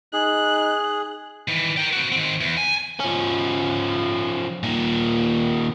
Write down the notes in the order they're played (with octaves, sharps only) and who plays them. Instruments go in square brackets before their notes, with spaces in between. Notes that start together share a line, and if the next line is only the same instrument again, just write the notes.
[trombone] D#4 [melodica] G#4 [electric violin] F#6
[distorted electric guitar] D#3 E3
A#4 G5
C4 F#4
D#3 C4
E2
G#5
[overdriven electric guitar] F3 C#4
A#2 D#3